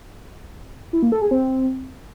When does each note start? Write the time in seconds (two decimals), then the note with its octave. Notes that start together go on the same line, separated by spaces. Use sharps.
0.93 E4
1.03 A#3
1.12 A4
1.22 G#4
1.31 C4